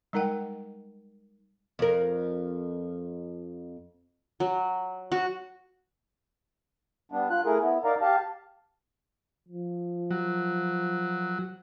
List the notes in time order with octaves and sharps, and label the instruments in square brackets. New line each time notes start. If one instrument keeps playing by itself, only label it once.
[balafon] G3 G#3 D#4 A#4 F#5 G5
[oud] F2 A#4
[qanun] F#3
F#4
[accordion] G3 B3 D4
F4 F#6
A3 E4 G#4 A#4
B3 E4
D#4 A#4 D5 F5 A#5
G4 F5 A5
[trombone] F3
[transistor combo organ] F#3